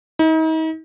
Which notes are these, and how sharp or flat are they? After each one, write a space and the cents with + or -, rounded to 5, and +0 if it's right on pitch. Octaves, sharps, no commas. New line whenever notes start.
D#4 +40